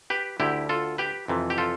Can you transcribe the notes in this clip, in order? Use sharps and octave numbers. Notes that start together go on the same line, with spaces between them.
G4 B4
D2 D3 E4 G4
F4 A4
G4 B4
F2 C3 E3
G4
F4 A4